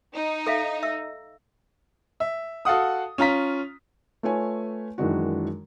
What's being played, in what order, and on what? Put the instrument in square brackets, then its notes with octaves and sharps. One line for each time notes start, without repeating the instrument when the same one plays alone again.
[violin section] D#4
[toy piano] A4 E5 F5
E5 E6
[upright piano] E5
F#4 A4 F5 F#5 D#6
C#4 F4 A#5 B6
[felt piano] A3 F4 B4 C#5 G#5
F#2 D#3 E3 G#3 D4 F#4